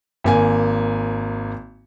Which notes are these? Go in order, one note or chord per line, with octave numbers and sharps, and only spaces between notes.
G#1 A#3 G#5